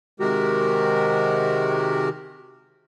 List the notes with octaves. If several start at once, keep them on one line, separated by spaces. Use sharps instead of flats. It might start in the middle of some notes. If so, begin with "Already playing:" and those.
C3 D#3 G#3 F#4 G4 A#4